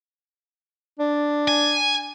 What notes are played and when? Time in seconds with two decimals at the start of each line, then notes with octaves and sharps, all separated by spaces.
1.00 D4
1.48 G#5